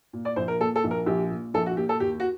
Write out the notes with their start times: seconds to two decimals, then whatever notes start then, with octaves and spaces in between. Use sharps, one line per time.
0.13 A#2
0.25 D5
0.36 A#1 C5
0.48 A#4
0.60 A#2 A4
0.76 A4
0.84 A#1
0.91 A#4
1.06 A#1 G4
1.31 A#2
1.54 A#1 A4
1.66 F#4
1.77 A#2 G4
1.89 A4
2.00 D#2 G4
2.20 F#4